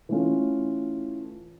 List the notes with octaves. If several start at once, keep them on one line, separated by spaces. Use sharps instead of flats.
E3 A3 C#4 F4